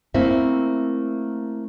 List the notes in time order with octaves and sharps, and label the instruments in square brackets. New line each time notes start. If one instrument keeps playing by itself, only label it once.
[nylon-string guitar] A3 A#3 C4 E4 E5